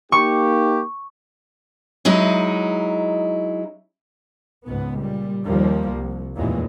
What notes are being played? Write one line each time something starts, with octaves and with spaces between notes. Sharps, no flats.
A#3 D#4 G4 C#6
F#3 G#3 D#4 E4
C#2 G#2 B3
A#2 G3
D#2 F3 G3 A#3
C2
F1 D#2 A#2 E3 G#3